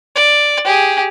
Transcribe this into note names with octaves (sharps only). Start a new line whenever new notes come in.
D5
G4 G#4